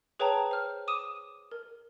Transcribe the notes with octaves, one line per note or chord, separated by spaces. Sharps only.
G#4 B4 C#5 G5 A5 A#5
C5 F6
D6 D#6 D#7 E7
A#4